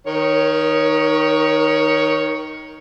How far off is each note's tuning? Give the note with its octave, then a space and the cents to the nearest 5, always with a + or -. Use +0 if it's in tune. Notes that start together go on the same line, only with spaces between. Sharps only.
D#3 +0 A#4 +40 C#5 +5